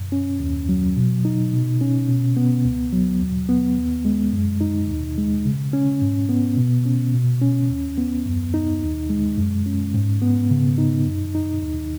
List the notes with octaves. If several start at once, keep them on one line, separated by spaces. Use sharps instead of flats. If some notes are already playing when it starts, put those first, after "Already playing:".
Already playing: F#2
C#4
D#2
F#3
B2
D#4
B2
C#4
B2
B3
C#2
F#3
D#2
B3
D#2
G#3
F#2
D#4
D#2
G#3
C#3
C#4
G#2
B3
B2
C#4
B2
C#4
D#2
B3
F#2
D#4
D#2
G#3
F#2
C#4
G#2
B3
C#3
D#4
F#2
D#4
D#2